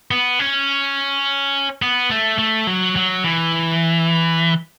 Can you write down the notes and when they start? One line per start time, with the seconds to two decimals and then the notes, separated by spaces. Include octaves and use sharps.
0.11 B3
0.39 C#4
1.82 B3
2.10 A3
2.39 A3
2.67 F#3
2.96 F#3
3.24 E3